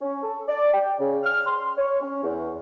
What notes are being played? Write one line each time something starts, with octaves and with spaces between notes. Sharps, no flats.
C#4
A4
D5
G5
C#3
F6
C6
C#5
C#4
E2